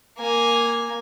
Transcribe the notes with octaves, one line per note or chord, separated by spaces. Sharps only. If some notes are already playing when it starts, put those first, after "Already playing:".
A#3 G#5